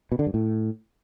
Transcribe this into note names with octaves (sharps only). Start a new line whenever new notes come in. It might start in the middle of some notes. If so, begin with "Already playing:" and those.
B2
D3
G2
A2